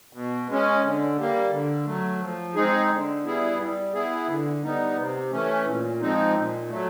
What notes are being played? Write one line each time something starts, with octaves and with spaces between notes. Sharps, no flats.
B2
G#3 C#4
D3
G3 A#3
D3
F#3 A3
F3
G#3 C4 D#4 G#4
D3
G3 B3 E4 G#4
G3
B3 E4 G#4
D3
G3 B3 D#4
C3
E3 A3 C#4
A#2
F3 G#3 C4 D#4
A#2
F#3 A3